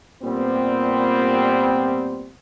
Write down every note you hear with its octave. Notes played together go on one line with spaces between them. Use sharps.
A#2 G3 B3 C4